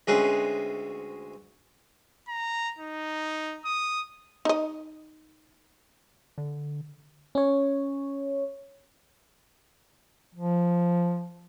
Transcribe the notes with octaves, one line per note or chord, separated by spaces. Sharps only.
D2 G#3 C4 C#4 B4
A#5
D#4
D#6
D#4 D#5
D3
C#4 C#5
F3